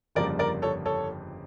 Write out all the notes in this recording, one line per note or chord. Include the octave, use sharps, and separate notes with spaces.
G1 F2 C#3 G3 A#3 A#4 D5
A#4 D5
A4 C#5
A4 C#5